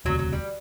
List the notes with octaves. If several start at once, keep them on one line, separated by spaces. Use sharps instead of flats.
E1 D2 C3 F#3
F#3
G3